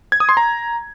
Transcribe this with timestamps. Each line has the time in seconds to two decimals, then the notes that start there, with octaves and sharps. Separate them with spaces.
0.12 G#6
0.20 D#6
0.29 C6
0.37 A#5